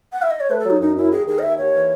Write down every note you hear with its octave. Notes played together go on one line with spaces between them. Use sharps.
F#5
E5
D#5
C#5
A3 B4
A4
F#3 D#4
F#2 D#4
F#2 E4
D#2 G#4
D#3 G#4
D#5
D#2 E5
D#2 C#5
E3